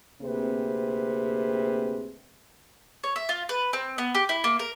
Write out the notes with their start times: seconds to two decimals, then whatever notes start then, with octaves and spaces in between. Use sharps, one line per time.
0.22 D2 C3 A#3 C4 G#4 B4
3.04 C#5
3.16 E5
3.29 F4
3.49 B4
3.73 C4
3.98 B3
4.15 G4
4.29 E4
4.44 A#3
4.59 A#4